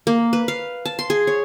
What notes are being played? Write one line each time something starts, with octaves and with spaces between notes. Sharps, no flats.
A#3
B4
F5
A5
C6
G#4
C#5